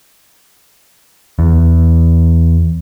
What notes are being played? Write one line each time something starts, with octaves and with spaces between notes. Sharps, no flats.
E2